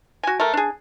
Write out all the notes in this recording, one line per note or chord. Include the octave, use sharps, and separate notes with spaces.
F#4 G#5
A3 A#4
D4 G#4